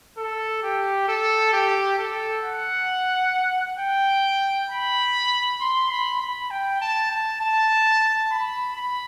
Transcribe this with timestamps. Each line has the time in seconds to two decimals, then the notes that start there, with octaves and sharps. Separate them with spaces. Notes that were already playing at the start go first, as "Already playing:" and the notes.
0.17 A4
0.63 G4
1.08 A4
1.53 G4
1.98 A4
2.44 F#5
3.79 G5
4.70 B5
5.61 C6
5.90 B5
6.21 B5
6.50 G5
6.81 A5
7.11 A5
7.41 A5
8.31 B5
8.76 B5